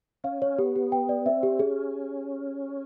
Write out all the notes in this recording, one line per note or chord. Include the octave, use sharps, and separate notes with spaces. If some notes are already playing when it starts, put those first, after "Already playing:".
C#4 F5
C#5
B3 G4
G4
G5
D5
C4 E5
G4
C#4 G#4